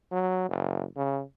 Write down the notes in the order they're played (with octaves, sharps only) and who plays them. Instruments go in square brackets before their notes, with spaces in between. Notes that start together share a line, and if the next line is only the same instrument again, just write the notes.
[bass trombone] F#3
F#1
C#3